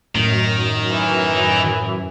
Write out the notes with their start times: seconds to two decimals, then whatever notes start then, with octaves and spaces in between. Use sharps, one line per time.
0.15 F#2 A2 D#3
0.91 E3